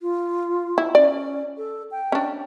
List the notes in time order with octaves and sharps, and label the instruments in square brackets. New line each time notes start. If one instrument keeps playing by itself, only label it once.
[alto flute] F4
[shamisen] E4
[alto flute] C#4 [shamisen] D5
[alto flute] A4
G5
[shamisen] C#4 D4